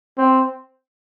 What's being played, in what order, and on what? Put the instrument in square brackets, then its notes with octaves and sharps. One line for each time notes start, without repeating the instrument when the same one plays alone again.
[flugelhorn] C4